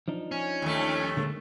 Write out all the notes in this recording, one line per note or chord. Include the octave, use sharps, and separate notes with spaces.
F3 D4 D#4
C#4
D#2 A3
D3 G#3 A#3